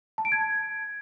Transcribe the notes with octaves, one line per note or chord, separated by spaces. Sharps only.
A5
D7
G#6